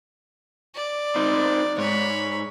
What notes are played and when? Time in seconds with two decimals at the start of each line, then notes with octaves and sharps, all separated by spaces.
0.75 D5
1.16 C4 D#4
1.78 G#2 C#5 B5